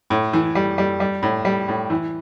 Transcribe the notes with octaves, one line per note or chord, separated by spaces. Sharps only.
A2
E3
G3
G3
G3
A2
G3
A2
E3